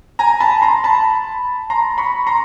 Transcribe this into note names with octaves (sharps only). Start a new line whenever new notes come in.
G#5 A#5
A5 B5
A#5 C6
A5 B5
A#5 C6
B5 C#6
A#5 C6